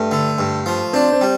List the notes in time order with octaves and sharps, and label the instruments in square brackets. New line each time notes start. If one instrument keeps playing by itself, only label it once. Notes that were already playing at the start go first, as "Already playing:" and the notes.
Already playing: [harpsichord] G2 [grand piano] A3
[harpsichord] D3
G2
F3
[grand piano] C4 [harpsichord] D4
[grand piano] C4
[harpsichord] G3